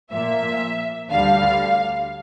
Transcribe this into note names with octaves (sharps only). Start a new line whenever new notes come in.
A#2 F3 A#3 E5
D2 D3 G3 F5